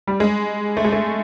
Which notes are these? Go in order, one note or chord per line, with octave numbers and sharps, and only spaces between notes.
G3
G#3
A3
G#3
A3